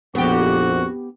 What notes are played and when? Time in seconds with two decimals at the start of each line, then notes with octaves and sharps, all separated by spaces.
0.15 A#1 F2 B3 F#4 G4